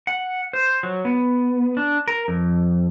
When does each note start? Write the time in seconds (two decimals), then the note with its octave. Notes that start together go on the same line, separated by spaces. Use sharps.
0.07 F#5
0.53 C5
0.83 F#3
1.05 B3
1.77 D4
2.08 A#4
2.28 F2